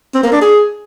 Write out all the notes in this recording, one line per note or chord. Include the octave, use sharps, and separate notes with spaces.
C4
A#3
D4
G#4